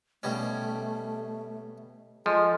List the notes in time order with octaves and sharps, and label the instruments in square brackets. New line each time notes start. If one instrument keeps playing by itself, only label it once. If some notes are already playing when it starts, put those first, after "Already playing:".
[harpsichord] B2 G3 C#4 [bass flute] A3
[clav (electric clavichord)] F3 [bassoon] G#3 [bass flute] A4